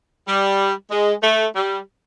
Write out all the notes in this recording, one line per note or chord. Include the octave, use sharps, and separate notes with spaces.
G3
G#3
A3
G3